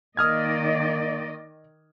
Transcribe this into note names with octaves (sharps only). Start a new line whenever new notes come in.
D#3 A#3 D5 D#5 D#6 F6 G#6